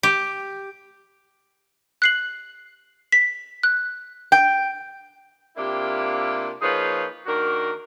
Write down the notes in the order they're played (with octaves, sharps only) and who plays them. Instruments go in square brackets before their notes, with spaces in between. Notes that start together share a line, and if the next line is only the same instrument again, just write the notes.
[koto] G4
[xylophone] F#6 C7 F#7
B6
F#6
[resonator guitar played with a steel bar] G5
[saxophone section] C3 A#3 D4 E4 F4 G4
F3 A#3 D#4 G#4 B4 C#5
D#3 A#3 D4 F#4 A#4